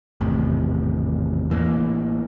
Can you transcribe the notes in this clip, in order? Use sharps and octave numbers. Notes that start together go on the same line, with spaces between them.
G#1 E2 A2 C3
A1 E3 G3 A#3